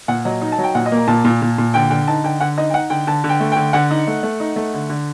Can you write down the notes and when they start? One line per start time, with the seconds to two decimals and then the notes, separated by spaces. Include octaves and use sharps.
0.08 A#2 F#5
0.25 F#3 D#5
0.42 D#4
0.52 A5
0.58 F#3
0.64 G5
0.75 A#2 F#5
0.86 D#5
0.92 A#3
0.98 A#5
1.08 A#2 A5
1.25 A#2
1.42 A#2
1.58 A#2
1.74 D3 G5
1.90 D3 G5
2.07 D#4 A5
2.24 D3 G5
2.40 D3 F#5
2.57 D#4 D#5
2.70 G5
2.74 D#4 F#5
2.90 D3 G5
3.07 D3 A5
3.24 D3
3.29 G5
3.40 A3
3.52 D3 G5
3.73 D3 F#5
3.91 D#4
4.07 A3
4.23 A3
4.40 D#4
4.56 A3
4.74 D3
4.89 D3